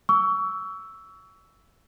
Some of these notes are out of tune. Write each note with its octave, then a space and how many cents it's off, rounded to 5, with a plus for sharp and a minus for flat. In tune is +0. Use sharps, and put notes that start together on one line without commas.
C#6 +30 E6 +0